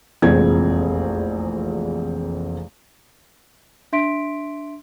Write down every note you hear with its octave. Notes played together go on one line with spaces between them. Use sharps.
F1 A#1 E2 G#3 C4 G#6
D4 E5 C6 B6 D7